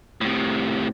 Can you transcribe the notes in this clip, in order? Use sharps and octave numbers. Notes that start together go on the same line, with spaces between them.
A2 C3